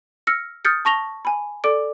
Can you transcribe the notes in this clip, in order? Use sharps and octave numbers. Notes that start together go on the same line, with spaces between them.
E6 F6 A#6 C#7
D#6 F6 G6 A6 C#7
A5 C#6 A#6 F7 G7
G#5 B5
A4 D5 D6 D7